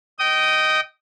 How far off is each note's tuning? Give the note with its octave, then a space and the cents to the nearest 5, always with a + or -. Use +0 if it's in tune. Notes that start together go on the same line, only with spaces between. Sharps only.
D#5 +0 G5 -25 D#6 +0